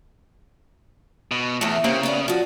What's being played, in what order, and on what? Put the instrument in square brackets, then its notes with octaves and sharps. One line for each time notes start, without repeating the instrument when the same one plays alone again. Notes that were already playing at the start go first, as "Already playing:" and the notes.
[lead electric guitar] B2
[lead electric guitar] E2 [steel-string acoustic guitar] A2 A3
[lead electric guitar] C#3 [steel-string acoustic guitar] A#3 C4 G4
[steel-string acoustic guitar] B3 A4 D5
F3 F#4